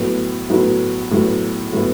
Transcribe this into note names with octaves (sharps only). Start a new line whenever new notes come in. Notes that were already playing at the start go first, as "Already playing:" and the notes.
Already playing: A2 F#3 B3
A2 F#3 B3
A2 F#3 B3
A2 F#3 B3